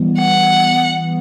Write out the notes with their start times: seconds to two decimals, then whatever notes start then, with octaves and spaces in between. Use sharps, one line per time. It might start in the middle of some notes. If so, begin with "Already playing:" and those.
Already playing: E3 G3 B3
0.19 F#5